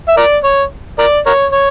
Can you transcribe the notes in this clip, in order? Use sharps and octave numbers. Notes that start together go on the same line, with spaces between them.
E5
A#4 D5
C#5
A#4 D5
A#4 C#5
C#5